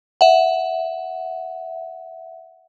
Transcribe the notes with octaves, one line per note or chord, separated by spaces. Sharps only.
E5 F#5